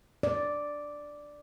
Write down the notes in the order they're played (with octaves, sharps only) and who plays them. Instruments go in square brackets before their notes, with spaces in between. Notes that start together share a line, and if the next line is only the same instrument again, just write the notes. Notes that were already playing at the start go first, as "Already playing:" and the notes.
[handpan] D5